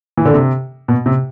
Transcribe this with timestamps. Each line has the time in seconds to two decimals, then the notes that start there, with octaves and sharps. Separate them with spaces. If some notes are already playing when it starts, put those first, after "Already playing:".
0.17 E3
0.25 D3
0.34 C3
0.88 B2
1.06 C3